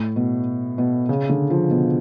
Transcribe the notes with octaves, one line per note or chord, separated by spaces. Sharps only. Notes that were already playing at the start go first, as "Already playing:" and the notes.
Already playing: A2
B2
B2
C#3
D3
F3
B2